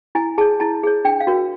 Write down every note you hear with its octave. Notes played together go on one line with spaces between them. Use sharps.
E4 G#5
G#4 C#5 A5
E4 A5
G#4 C#5
D4 G5
F5
F#4 A#4 C#5